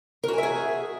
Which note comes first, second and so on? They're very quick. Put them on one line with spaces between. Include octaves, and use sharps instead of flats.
A#4 F#4 G#5 E5 G#4